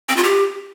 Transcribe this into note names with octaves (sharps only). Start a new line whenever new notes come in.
C4
F4
G4